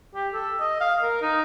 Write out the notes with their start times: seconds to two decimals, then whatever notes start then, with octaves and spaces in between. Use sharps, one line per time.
0.15 G4
0.33 A4
0.60 D#5
0.80 F5
1.03 A#4
1.22 D#4